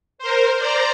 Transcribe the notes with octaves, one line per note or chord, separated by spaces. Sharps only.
A#4 C5
C5 D5 A#5